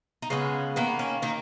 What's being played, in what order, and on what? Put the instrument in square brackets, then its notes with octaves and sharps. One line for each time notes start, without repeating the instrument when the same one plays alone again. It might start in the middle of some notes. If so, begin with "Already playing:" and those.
[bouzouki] D#4
C#3 G#3 B3 C#4
D#3 A#3 B3
C#4
D#3 A#3 D#4